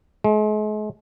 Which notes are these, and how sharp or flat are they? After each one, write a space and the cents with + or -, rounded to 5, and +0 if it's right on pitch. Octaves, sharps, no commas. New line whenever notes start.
G#3 +40